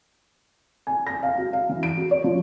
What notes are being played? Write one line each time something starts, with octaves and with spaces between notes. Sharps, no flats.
G#5
A#6
F5
F#4
F5
E3
D7
F#4
C#5
F3